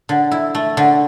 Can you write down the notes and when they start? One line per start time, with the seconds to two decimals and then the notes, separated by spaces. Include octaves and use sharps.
0.09 D3
0.31 E4
0.55 A3
0.77 D3